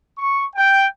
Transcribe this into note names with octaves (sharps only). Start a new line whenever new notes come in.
C#6
G5